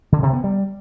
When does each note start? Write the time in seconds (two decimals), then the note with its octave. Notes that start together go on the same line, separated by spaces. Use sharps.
0.12 D3
0.23 C3
0.33 B3
0.44 G3